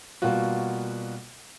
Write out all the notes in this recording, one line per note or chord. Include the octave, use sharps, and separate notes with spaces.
B2 G3 A#3 F4 F#4